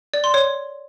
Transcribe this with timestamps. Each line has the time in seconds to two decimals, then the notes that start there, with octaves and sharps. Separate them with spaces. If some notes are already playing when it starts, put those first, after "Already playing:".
0.14 D5
0.24 C6
0.34 C#5